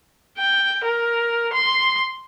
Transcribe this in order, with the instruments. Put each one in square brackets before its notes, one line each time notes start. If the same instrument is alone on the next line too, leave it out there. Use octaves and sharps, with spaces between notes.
[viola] G5
A#4
C6